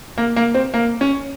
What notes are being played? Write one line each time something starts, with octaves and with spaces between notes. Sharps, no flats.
A#3
A#3
C4
A#3
C#4